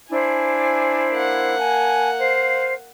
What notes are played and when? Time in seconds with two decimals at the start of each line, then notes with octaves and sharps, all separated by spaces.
0.10 D4 E4 C5 G#5
1.12 A#3 F#5
1.58 G#5 A5
2.19 C5 F5